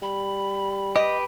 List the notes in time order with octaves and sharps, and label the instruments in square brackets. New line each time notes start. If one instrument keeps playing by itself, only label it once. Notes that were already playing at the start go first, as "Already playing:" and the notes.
[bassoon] G3 [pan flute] B5
[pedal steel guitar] G4 B4 [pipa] D#5